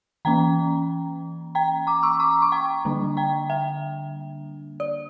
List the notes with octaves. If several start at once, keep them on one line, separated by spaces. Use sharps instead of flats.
E3 A#3 C#4 G5 A#5
G5 A#5
A#5 D6
C#6 E6
A#5 D6
C#6
G5 A#5
D3 G3 A#3 D4
G5 A#5
E5 G5
D5